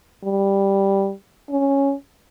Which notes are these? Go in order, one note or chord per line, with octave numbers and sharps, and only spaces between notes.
G3
C#4